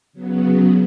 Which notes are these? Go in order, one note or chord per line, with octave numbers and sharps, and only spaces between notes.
C#3 F#3 B3